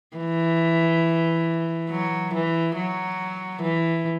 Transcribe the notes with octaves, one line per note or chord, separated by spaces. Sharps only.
E3
F#3
E3
F#3
E3